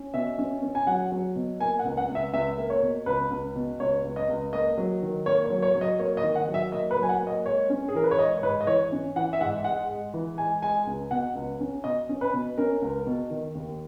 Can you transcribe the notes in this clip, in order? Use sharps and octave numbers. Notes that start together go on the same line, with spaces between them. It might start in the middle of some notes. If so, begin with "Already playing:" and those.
Already playing: C#4
B2 E5
C#4
C#4
G#5
F#3 F#5
F#3
B2
A#3 G#5
F#5
C#2
F#5
C#2
E5
C#2 E5
A#3
C#5
B2
C#2 B4
C#2
B2
C#2 C#5
C#2
D#5
C#2
A#3 D#5
F#3
D#3
A#3 C#5
C#5
F#3
C#5
F#3
D#5
A#3 C#5
D#5
D#3
F#5
F#3
E5
A#3 D#5
B4
F#3
G#5
F#5
A#3
D#5
G#3 C#5
C#4
G#4
E3 A#4
B4
C#5
G#3 D#5
C#5
G#2 B4
D#5
E3 C#5
C#4
E3 F#5
E5
G#2 F#5
G#3 F#5
G#3
E3
G#3 G#5
G#3 G#5
C#2
B2 F#5
C#2
C#4
B2 D#5
C#4
B4
B2
C#4 A#4
C#2
B2
D#3
D#2